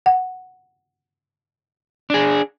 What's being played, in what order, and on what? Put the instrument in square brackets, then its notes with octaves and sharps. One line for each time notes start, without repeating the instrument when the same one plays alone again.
[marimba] F#5
[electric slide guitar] D4 G#4